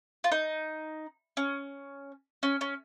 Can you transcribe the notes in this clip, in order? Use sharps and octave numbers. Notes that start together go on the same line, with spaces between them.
F4
D#4
C#4
C#4
C#4